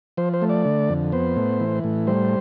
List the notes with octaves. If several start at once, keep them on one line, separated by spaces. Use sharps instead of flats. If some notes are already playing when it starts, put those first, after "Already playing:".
F3 C5
C5
A3
D5
D3
F2
B3 C5
A2
E3
A2
G3 C5